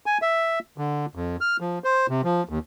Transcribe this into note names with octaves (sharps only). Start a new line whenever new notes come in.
G#5
E5
D3
F2
F6
F3
C5
C3
F3
D#2